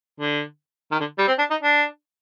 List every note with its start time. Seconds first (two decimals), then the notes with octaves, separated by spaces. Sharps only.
0.20 D3
0.91 D#3
1.00 D3
1.18 G3
1.27 C4
1.39 D4
1.50 D#4
1.63 D4